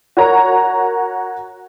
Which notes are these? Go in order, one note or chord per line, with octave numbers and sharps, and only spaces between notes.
F#4 A#4 C#5 A#5